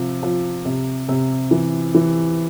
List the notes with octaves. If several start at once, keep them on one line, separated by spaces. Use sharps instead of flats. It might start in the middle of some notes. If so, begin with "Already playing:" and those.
Already playing: C3 F3
F3
C3
C3
E3
E3